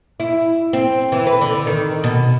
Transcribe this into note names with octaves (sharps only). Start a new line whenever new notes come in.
E4
C4
E3
B4
D3
D#3
B2